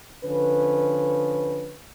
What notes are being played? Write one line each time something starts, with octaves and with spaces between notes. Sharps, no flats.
D3 F3 C#4 B4